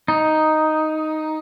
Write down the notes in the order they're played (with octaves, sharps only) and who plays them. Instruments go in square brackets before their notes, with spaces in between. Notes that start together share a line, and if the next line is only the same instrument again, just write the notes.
[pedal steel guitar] D#4